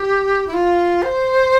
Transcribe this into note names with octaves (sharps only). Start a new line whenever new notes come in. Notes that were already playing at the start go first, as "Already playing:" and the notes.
Already playing: G4
E4
F4
C5